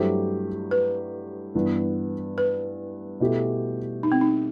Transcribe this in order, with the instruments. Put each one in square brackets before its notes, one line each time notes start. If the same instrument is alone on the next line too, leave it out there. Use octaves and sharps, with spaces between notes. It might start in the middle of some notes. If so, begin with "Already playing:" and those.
Already playing: [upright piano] G2 F#3 A3 E4 G4 [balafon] C5
[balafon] B4
[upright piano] G2 E3 B3
[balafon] B4
[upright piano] B2 A3 E4 G4
[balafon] D#4
C4
D#4